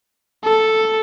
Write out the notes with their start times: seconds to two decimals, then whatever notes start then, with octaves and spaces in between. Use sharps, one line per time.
0.44 A4